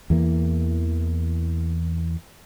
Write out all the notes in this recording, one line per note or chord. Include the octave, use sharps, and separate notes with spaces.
E2 E3 A#3